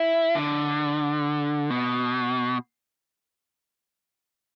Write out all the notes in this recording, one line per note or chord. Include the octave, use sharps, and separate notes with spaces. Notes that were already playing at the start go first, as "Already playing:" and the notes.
Already playing: E4
D3
B2